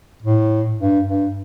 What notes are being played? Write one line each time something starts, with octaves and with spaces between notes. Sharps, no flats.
A2
G2
G2